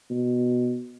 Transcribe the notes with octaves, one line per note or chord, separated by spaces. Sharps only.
B2